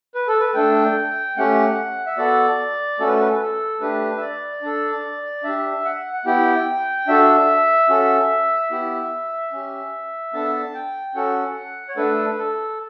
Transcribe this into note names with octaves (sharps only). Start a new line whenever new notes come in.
B4
A4
B4
A3 D4 A4 G5
A3 C#4 G4 F#5
E5
B3 F#4 A4 D5
A3 C#4 F#4 A4
B4
A4
B4
A4
B4
A4
A3 D4 G4 B4
E5
D5
D4 A4
D4 G4 E5
F#5
F#5
B3 E4 G4 G5
D4 F#4 A4 E5
C#4 F#4 A4
B3 E4 G4
C#4 G4
B3 D4 A4 A5
G5
C#4 F#4 A4 F#5
C#5
A3 D4 A4 B4
A4